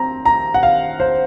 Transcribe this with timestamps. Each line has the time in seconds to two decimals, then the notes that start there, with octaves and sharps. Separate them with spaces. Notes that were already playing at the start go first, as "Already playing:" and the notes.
Already playing: C4 A#5
0.25 A#5
0.54 F#5
0.63 F5
1.00 C5